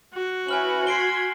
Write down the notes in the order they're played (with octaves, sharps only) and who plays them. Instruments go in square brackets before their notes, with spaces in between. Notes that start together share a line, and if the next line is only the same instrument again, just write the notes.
[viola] F#4
[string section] C#4 E4 B4 [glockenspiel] G#5 F6 F#7
[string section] C6 G#6 B6 [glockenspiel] C7 D7 G7